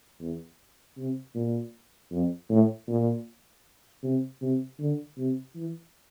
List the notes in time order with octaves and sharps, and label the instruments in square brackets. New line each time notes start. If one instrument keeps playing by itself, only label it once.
[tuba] E2
C3
A#2
F2
A2
A#2
C3
C3
D3
C3
E3